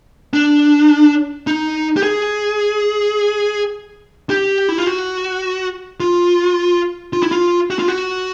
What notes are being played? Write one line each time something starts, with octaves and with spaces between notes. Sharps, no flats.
D4
D#4
G4
G#4
G4
E4
F4
F#4
F4
F4
E4
F4
F#4
F4
F#4